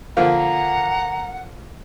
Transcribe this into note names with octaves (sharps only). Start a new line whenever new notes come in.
D3 F3 A#3 F5 F#5 A#5